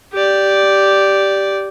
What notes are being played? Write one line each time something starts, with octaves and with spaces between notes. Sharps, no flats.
G4 D5